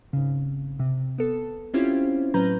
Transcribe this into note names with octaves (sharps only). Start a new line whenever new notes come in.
G#1 C#3
C3
B3 A4
C4 C#4 E4 F4 G4 C5
A2 F#3 C#4 B4 A#5 G6